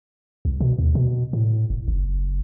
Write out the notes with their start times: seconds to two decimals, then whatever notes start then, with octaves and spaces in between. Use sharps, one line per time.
0.45 C2
0.60 B2
0.79 D#2
0.95 B2
1.33 A2
1.70 E1
1.88 F#1